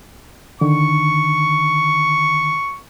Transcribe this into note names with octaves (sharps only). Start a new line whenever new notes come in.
D3 D#3 C#6